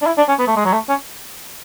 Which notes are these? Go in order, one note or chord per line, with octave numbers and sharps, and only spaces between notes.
D4
E4
D4
C#4
B3
A3
G#3
F#3
A3
C#4